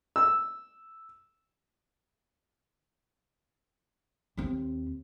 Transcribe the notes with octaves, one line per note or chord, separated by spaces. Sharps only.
E6
D#2 C4